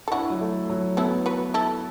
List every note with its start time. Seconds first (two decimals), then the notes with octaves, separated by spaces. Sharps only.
0.08 A4
0.12 D4 E4 F#4
0.30 F#3
0.41 A3
0.70 F#3
0.97 B3 E4 A4
1.26 F#4 B4
1.54 E4 A4